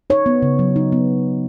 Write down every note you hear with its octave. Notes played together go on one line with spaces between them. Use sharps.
D#4 C#5
B3
C#3
F#3
D#4
B3